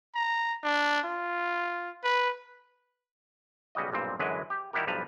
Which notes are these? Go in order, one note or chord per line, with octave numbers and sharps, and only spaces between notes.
A#5
D4
F4
B4
B1 C#3 G3 F#4 D#5
B1 G2 A#2 C4
F#2 D3 E3 F#3 G#3 B4
G4
D#3 G3 E4 F#4 G4 A#4
B1 G2 F3 B4 A5 A#5